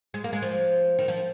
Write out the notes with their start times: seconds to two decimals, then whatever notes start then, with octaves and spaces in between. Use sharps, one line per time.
0.14 G#3
0.24 A#3
0.33 G#3
0.42 F3
0.99 D#3
1.08 F3